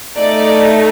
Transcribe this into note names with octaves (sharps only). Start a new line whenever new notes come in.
A3 D#4 A4 D5